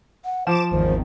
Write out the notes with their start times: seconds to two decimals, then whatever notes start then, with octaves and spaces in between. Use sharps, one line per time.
0.25 F#5
0.47 F3 C5 D6 E7
0.71 G#1 E2 D#3 C5